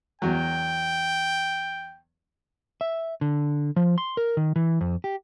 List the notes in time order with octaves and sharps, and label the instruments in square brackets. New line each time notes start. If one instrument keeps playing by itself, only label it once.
[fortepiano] E2 F#3 [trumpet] G5
[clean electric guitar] E5
D3
F3
C6
A#4
D#3
E3
F2
G4